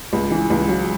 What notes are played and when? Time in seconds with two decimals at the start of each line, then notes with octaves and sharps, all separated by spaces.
0.13 C#2
0.31 E3
0.50 C#2
0.69 F#3